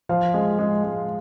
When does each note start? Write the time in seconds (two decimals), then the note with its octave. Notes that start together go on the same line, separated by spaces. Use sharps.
0.09 F3 F5
0.34 G#3
0.59 G#3
0.84 G#3